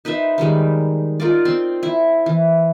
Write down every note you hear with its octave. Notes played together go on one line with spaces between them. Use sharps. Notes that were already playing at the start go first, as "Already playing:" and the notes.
D#4 B4 C5 E5
D#3 G3 G#3 D#4
D#4 F4 A#4 D5
C4 C6
E4
E3